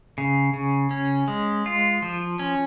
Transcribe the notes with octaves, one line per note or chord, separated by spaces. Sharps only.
C#3
C#3
C#4
G#3
F4
F3
C#4